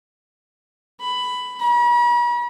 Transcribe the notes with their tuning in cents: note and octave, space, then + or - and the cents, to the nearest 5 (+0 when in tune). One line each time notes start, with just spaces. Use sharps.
B5 +10
B5 -45